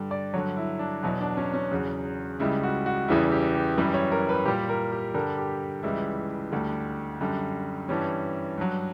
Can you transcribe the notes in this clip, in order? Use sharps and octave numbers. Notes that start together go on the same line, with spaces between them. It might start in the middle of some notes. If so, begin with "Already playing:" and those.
Already playing: G2 D3 G3
D5
G2 D3 F#3 C#5
E4
D4
E2 B2 F#3 E4
D4
C#4
C#4
E2 C#3 F#3
C#2 C#3 G3 E4
F#4
F#4
E2 C#3 E3 G3 E4
G4
G4
F#2 E3 G3 B4
C#5
A#4
B4
A#2 G3 G4
A#4
G4
G2 D3 G3 A#4
G4
C#2 C#3 E3 G3 E4
D2 D3 G3
F#2 D3 G3
G2 E3 G3 C#4
G2 F#3